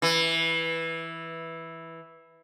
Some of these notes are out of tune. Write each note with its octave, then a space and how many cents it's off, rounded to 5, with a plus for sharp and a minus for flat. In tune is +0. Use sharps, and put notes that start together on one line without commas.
E3 -5